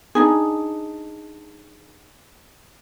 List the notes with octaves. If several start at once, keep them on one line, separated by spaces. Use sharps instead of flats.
D4 D#4 G#4